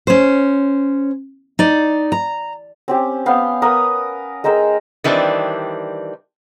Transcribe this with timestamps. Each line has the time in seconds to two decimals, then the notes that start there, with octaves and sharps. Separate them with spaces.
0.07 C#4 C5
1.59 D#4 D5
2.12 A#5
2.88 C4 C#4 G4
3.26 B3 F5 G5
3.62 A#4 B4 F#5 D#6
4.44 G#3 A#4 G5 E6
5.04 D#3 E3 G3 C4 D4